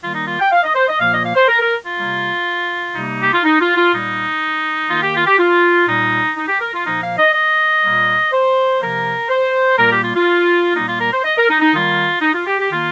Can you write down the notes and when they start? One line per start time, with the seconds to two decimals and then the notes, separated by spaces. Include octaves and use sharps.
0.01 D#3 G3 A#3 F4
0.14 D#4
0.26 F4
0.39 G5
0.51 F5
0.63 D#5
0.75 C5
0.88 D#5
0.99 A#2 F3 A#3 F5
1.12 D#5
1.24 F5
1.35 C5
1.48 A#4
1.61 A#4
1.85 F4
1.97 C3 G3 A#3
2.94 C3 G3 A#3 D#4
3.22 G4
3.32 F4
3.43 D#4
3.60 F4
3.76 F4
3.92 A#2 G3 A#3 D#4
4.89 D#3 A#3 F4
5.02 G4
5.16 F4
5.26 G4
5.38 F4
5.87 A#2 G3 A#3 D#4
6.36 D#4
6.48 G4
6.60 A#4
6.73 F4
6.84 A#2 F3 A#3 D#4
7.01 F5
7.18 D#5
7.34 D#5
7.82 A#2 G3 A#3
8.32 C5
8.80 C3 F3 A#3 A#4
9.29 C5
9.77 A#2 G3 A#3 A#4
9.90 G4
10.03 F4
10.15 F4
10.75 A#2 G3 A#3 D#4
10.88 F4
10.99 A#4
11.12 C5
11.24 D#5
11.37 A#4
11.49 D#4
11.61 D#4
11.73 D#3 G3 A#3 F4
12.22 D#4
12.34 F4
12.47 G4
12.59 G4
12.70 D#3 A#3 F4